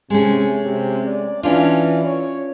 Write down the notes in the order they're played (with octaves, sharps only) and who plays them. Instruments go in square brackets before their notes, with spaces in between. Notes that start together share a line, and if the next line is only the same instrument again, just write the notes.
[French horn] C3 [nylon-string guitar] G#3 A3 C#4
[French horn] C3
D5
[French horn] E3 [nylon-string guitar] C#4 D4 F4
[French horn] C#5